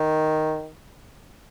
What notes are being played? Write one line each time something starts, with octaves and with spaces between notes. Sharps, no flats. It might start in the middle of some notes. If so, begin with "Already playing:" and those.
Already playing: D#3